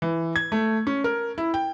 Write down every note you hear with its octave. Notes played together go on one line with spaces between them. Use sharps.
E3
G#6
A3
C#4
A#4
E4
G5